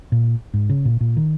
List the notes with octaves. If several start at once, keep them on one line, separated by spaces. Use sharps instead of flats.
A#2
G#2
C#3
A#2
A#2
D#3